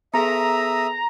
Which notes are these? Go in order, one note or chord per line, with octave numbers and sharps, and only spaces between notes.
B3 G#4 A4 E5 A#5 D#6 E6